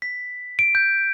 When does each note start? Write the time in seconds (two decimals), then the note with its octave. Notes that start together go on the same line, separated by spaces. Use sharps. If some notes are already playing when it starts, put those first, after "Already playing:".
0.02 B6
0.59 D7
0.75 G6